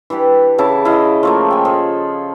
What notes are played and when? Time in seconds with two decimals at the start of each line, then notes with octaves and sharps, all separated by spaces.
0.10 E3 D4 G4 B4
0.58 C#3 E4 A5 D6
0.85 E4 D#5 F5
1.23 F3 A3 A#3
1.51 G5 G#5
1.65 F3 G#4 A4